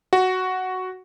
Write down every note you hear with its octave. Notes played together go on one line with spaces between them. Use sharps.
F#4